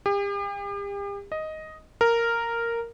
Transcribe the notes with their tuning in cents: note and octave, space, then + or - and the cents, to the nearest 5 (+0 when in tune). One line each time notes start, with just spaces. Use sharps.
G4 +40
D#5 +5
A#4 -5